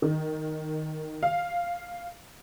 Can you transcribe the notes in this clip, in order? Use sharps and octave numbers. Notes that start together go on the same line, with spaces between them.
D#3
F5